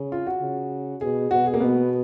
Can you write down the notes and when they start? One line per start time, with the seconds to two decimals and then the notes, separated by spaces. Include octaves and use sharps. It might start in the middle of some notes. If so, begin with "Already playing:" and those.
Already playing: C#3
0.12 F4
0.27 F#4
0.42 C#3
1.01 B2 G#4
1.31 B2 F#4
1.46 G#4
1.54 A#3
1.61 B2 B3